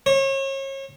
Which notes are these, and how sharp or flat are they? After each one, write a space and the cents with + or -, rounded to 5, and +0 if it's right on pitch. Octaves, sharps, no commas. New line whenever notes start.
C#5 -35